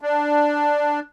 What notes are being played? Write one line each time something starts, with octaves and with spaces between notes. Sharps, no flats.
D4